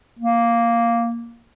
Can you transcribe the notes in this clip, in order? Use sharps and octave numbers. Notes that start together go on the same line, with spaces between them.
A#3